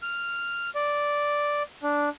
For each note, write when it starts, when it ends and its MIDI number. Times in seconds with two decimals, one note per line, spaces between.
0.02 0.70 89
0.75 1.63 74
1.83 2.09 62